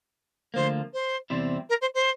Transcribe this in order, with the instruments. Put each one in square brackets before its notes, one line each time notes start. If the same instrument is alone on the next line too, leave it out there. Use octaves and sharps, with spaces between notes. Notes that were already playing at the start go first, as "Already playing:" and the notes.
[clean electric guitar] D2 D3 F3 A#3 [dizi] C5
[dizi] C5
[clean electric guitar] E2 C3 G3 C4 E4
[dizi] A#4
C5
C5